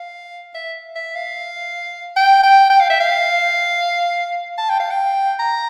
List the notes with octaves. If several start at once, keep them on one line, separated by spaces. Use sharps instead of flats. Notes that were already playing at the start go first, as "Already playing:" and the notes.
Already playing: F5
E5
E5
F5
G5
G5
G5
F5
E5
F5
A5
G5
F5
G5
A#5